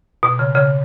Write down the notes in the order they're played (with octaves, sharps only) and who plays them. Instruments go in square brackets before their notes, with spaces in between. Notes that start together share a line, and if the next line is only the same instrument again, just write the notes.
[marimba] B2
C#3
C#3